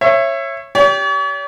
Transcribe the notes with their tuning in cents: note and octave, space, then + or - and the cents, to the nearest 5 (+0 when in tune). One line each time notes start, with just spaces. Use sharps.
C#5 -20 E5 +20
G4 +0 C#5 +45